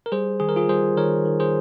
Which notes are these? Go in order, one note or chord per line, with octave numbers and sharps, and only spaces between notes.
A#4
G3 G#4 C5
D#3 G#4
A#4
F4 G#4
G3 G#4 C5
D#3 A#4 C#5
D#3
G#4 C5